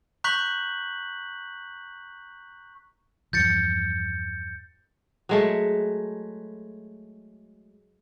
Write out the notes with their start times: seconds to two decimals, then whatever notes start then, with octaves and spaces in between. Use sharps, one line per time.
0.24 A#5 C#6 F#6 G6 B6 F#7
3.33 E2 G2 F3 G6 A6 C#7
5.29 F#3 G#3 A3